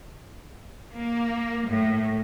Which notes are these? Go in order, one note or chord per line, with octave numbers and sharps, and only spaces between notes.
A#3
A2